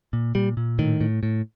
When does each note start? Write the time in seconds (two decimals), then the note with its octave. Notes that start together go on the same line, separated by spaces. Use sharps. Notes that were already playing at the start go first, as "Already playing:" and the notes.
0.13 A#2
0.35 A#2 G3
0.57 A#2
0.79 A2 D#3
1.01 A2
1.23 A2